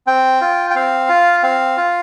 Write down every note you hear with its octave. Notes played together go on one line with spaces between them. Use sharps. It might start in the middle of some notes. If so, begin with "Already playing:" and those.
C4 G5
F4
G5
C4 F5
F4
C4 F5
F4